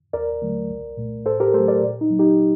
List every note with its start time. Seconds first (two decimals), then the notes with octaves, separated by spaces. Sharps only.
0.13 D#2 A#4 D5
0.42 D3 F#3 A3
0.70 C2
0.97 A#2 A3
1.26 A2 A4 C5
1.40 G4 A#4
1.54 F#3 A3 A4 C5
1.68 A#4 D5
1.82 A#2
2.01 D#4
2.10 F#3 A#3
2.19 D#4 G4